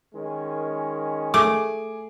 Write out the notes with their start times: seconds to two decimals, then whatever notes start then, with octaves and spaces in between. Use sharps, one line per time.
0.14 D#3 G#3 C#4
1.34 A3 G#4 D6